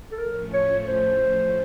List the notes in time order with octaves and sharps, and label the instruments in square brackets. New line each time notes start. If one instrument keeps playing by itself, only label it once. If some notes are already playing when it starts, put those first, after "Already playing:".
[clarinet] A4
[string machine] A2 F3 A3 C#4 [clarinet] A#4
[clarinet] C#5
C5